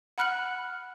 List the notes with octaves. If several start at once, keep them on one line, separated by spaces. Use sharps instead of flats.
F#5 B5 F6 F#6 C#7 F#7